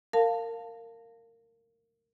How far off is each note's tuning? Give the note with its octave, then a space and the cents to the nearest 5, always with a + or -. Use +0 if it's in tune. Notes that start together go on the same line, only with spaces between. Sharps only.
A#4 -20 F5 +0 A5 +15